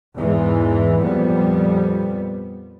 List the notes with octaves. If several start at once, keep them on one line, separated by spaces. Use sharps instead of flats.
E2 G#2 E3 G#3
F2 A#2 G3 B3